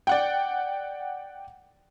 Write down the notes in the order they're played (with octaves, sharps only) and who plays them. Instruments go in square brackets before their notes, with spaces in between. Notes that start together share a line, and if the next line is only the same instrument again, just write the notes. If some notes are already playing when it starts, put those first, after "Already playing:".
[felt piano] D5 F#5 G5